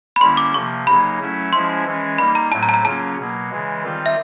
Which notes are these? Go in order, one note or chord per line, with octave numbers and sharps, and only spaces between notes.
B5
D3 G3 A#3 C#4 E4 C6
D6
C3 F3 A#3 C#6
C#3 F#3 A#3 D#4 B5
F#3 A3 C#4 E4
F3 G#3 C#4 E4 C6
E3 G#3 C#4
G3 A#3 D#4 B5
A#5
A2 F#3 A3 C4 A5
A#5
A5
A#5
C#3 F#3 A#3 C#4 F4 A5
B2 F#3 A#3
C#3 E3 G#3
D#3 G3 C4 F4
E5